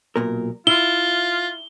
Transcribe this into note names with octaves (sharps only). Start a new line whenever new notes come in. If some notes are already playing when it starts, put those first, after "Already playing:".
B1 A#2 A#4
E4 F4 G7